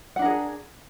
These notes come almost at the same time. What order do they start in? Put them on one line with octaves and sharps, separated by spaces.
F#5 D4 A#4 G#4